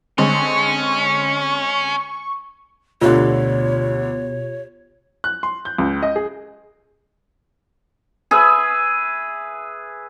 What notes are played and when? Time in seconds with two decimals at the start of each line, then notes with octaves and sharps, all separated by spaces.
0.18 D3 G#3 C4 C#4 C#6
3.01 D2 B2 D3 F4 G4 C#5
5.24 F#6
5.43 C6
5.65 G6
5.78 C#2
6.02 D#5
6.16 G#4
8.31 G#4 B4 E5